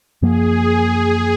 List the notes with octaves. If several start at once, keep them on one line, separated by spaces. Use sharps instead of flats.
F#2 F3 A#3 G#4